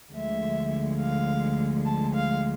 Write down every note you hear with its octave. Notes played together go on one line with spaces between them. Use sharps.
D2 D3 F3 G#3 E5
F5
A5
F5